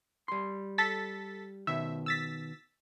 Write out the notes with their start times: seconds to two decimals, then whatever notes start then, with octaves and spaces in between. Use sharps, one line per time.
0.28 G3 C6
0.78 A4 A6 B6
1.67 B2 D#3 E5
2.06 E6 A6 B6